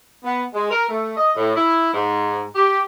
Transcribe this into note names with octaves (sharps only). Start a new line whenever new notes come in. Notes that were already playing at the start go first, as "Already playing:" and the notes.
B3
G#3
A#4
A3
D#5
A2
E4
G#2
G4